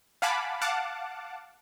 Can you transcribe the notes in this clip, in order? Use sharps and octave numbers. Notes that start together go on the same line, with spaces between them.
F5 F#5 G#5 A5 B5 D6
F5 F#5 A5 D6